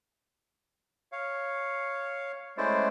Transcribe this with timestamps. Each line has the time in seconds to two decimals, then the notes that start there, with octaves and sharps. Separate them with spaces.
1.12 C#5 F5
2.57 G#3 A3 C#4 E4 C5 D5